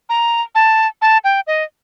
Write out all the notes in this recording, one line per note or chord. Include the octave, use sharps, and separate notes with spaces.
A#5
A5
A5
G5
D#5